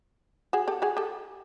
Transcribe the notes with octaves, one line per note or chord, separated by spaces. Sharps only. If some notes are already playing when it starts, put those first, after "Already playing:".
F#4 G#4
G4 A4
F#4 G#4
G4 A4